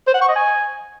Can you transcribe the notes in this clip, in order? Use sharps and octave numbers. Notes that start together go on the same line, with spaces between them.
C5
F#5
C#6
D#5
G#5